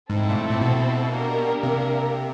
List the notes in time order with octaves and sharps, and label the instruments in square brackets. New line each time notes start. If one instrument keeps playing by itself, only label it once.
[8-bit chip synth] G#2 [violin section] C4 E4 A4
[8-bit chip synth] A#2
A2
A#2
B2
[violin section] A#3 D4 G4 A#4
[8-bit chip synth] C3